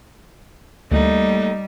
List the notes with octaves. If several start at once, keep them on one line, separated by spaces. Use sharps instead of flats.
D2 G3 A3 A#3 D#4 A4